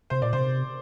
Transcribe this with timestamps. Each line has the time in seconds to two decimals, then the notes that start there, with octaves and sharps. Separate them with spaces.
0.10 C3 C5
0.22 A#2 D5
0.33 C3 C5